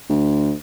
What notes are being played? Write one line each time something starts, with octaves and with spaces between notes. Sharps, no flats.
D2